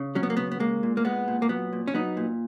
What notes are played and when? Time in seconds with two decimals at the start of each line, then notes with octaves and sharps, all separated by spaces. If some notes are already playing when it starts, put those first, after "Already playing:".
Already playing: C#3
0.15 F#3 C#4
0.23 B3
0.30 A#3
0.37 C#3 B3
0.52 B3
0.60 G#3 A#3
0.83 A#2
0.97 A#3
1.05 G#3 B3
1.28 A#2
1.42 A#3
1.49 F#3 B3
1.73 A#2
1.88 C#4
1.94 F#3 B3 D#4
2.17 A#2